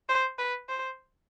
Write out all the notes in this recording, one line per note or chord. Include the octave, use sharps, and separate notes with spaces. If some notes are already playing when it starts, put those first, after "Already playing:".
C5
B4
C5